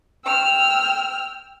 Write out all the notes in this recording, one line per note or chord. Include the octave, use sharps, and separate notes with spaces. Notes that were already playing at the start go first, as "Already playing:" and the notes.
G5 E6 F6